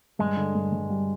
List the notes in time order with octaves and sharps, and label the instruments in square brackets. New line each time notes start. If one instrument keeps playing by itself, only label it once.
[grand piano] G2 [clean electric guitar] G#3
[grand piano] D3
G2
G2
G3